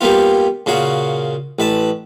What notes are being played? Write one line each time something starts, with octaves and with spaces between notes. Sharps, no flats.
G3 A#3 B3 F4
A#2 C#3 A#3 F#4
A1 B4 A5